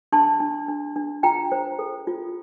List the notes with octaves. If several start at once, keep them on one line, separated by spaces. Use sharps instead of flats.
D4 A5 C6
D4
D4
D4
F4 G5 A#5
C5
A4
F4